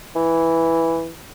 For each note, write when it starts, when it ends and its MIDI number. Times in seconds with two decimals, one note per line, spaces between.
0.16 1.11 52